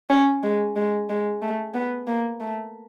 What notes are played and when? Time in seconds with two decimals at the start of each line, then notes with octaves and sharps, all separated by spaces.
0.10 C#4
0.43 G#3
0.76 G#3
1.09 G#3
1.42 A3
1.74 B3
2.07 A#3
2.40 A3